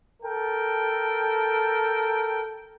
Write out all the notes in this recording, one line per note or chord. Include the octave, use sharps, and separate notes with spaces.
A4 A#4 G5